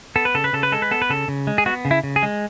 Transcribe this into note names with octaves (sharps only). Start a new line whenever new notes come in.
B3 A4
B4
C#3 A4
B4
C#3 A4
B4
G#3 A4
B4
B3 A4
B4
C#3 A4
C#3
G#3
G#4
B3 F#4
C#3
E4
C#3
G#4
G#3